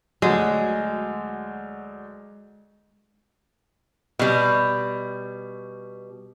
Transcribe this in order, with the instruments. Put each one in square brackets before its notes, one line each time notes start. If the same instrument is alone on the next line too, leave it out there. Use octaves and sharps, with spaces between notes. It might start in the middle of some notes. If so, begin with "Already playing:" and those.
[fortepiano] D2 F#3 [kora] G#3
[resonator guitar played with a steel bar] B2 G3